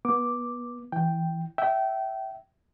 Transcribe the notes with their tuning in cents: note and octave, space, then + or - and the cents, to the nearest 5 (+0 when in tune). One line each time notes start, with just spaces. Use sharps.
B3 -25 D6 +0
E3 +0 G5 +0
E5 +0 G5 -25